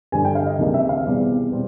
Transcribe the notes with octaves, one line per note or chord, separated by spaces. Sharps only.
G2 D3 G3 G#5
G5
F5
D#5
C#2 C3 D#3 G3 A#3
E5
F5
E2 B2 G3 C4
B2 G3 C4